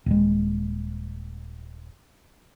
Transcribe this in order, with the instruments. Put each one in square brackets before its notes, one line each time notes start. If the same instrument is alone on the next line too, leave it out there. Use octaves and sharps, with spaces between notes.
[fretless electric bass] D#1 G#3